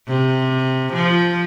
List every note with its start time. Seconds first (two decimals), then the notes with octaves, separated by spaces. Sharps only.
0.08 C3
0.93 F3